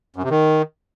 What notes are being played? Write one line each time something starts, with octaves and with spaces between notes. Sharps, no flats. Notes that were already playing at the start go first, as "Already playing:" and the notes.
F#2
C3
D#3